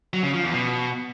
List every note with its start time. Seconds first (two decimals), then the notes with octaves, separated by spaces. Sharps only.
0.13 F#3
0.24 C#3
0.34 F3
0.44 E2
0.54 B2